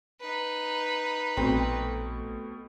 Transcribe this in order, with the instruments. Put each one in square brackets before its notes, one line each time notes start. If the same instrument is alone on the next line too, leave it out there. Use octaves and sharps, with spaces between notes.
[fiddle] D#4 B4
[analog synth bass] A#1 [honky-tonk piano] B2 A3 [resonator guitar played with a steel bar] C4